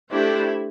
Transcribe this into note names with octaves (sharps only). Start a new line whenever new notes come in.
A3 D4 E4 G4 C5